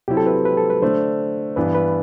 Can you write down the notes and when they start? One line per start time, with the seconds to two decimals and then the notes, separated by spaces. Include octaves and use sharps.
0.08 C3 F#3 C4 E4 G4
0.17 A4
0.26 B4
0.45 B4
0.57 A4
0.70 B4
0.82 D3 A3 D4 C5
1.56 G2 E3 B3 D4 B4
1.75 B4